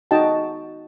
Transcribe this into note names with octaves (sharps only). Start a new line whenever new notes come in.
D#4 F#4 D#5 G5 A5